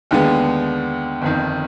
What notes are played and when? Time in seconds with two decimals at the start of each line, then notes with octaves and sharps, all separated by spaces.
0.11 D#2 D3 G#3 B3
1.22 G1 F2 D#3